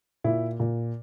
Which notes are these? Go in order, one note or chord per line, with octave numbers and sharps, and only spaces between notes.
A#2 E4
A#2